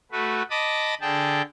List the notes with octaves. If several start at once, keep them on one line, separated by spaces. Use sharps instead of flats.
A3 F#4 B4
D#5 A5 B5 D6 D#6
D3 G#4 G5 A5